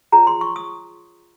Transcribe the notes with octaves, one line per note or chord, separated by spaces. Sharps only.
F4 G#4 C#5 A#5
C6
C#6
D#6